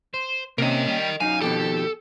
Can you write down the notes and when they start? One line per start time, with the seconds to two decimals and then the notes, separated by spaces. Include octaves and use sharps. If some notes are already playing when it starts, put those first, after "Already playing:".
0.14 C5
0.58 C3 A#3 C#4 A#4 D#5
0.86 G3
1.20 F#2 D#4 F5 G#5
1.41 F2 B2 D#3 G4 A4